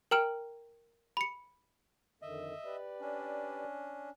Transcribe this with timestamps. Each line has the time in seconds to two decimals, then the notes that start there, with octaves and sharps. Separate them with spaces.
0.11 A#4 G5 A#5 F6 D7 F#7
1.17 B5 C#7
2.22 F2 D3 D#3 D#5 E5
2.65 G4 B4 D5
3.01 C#4 D4